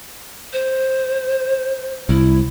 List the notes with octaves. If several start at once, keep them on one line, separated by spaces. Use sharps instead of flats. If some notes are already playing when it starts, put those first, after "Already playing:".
C5
C2 E4